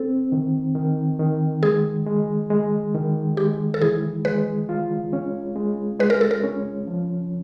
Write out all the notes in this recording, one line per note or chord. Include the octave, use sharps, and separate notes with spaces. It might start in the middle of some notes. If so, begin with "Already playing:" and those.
Already playing: C4 A4
D#3
D#3
D#3
G#3 G#4
G#3
G#3
D#3
G#3 G4
A4
E3 G#4
G#3 B4
F4
C#4
G#3
G#3 B4
A#4
A4
A#4
C#4
F3